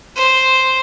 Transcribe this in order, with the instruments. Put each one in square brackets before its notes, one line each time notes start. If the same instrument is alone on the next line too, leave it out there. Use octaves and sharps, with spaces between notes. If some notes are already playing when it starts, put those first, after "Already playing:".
[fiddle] C5